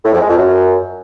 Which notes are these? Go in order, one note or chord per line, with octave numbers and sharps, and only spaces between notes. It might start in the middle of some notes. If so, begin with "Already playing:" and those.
A2
F2
G#3
F2
F#2